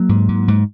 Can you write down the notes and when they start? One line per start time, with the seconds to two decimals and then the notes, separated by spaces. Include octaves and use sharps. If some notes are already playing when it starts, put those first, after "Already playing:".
Already playing: F#3 A#3
0.09 G#2
0.29 G#2
0.48 G#2